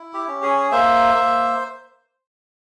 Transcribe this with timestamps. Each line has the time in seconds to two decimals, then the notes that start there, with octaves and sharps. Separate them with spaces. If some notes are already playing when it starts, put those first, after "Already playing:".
Already playing: E4
0.13 G4
0.28 C#4
0.43 G#4
0.71 A#3 C5 E5
1.15 A#3